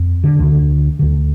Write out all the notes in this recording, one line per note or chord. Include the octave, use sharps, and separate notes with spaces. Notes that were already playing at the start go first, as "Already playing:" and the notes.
Already playing: F2
D3
D2 D3
D2 D3